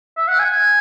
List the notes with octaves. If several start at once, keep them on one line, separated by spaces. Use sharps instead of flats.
E5
F#5
G#5